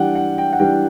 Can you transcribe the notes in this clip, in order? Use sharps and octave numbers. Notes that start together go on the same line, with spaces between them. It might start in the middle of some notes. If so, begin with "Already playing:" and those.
Already playing: E3 G3 D4 F#5 G5
F#5
G5
F#5
E3 G3 D4 G5